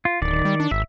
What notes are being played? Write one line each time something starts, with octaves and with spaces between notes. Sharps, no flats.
F4
D1 D#3 D5
G3
D4
G#1 E5